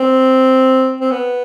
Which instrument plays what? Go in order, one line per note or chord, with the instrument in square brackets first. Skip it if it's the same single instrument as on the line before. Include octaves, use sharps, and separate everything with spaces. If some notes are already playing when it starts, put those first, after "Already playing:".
Already playing: [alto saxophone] C4
C4
B3